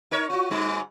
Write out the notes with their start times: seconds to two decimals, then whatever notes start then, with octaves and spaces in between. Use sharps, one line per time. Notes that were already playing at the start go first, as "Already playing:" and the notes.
0.11 D#4 A#4 C#5
0.30 F4 F#4
0.50 G#2 G3 D#4